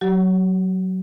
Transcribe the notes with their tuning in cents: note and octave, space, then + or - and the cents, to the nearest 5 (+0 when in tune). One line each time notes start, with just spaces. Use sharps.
F#3 +10 G4 -40